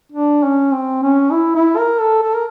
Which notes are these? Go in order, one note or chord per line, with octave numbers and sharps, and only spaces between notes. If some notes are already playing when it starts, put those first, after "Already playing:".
D4
C#4
C4
C#4
E4
E4
A#4
A4
A4
A#4